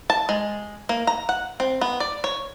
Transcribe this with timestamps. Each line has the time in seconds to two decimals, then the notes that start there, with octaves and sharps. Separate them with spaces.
0.10 A5
0.29 G#3
0.89 A#3
1.07 A#5
1.29 F#5
1.60 C4
1.81 B3
2.00 D5
2.24 C#5